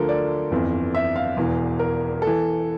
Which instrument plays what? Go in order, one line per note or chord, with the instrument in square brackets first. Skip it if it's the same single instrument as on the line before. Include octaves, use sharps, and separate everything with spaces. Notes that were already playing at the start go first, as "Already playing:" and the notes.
Already playing: [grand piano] D2 D3 F3 A4 A#4
D5
G1 F2 E3
E5
F5
E1 E2 E3
A#4
A4
E3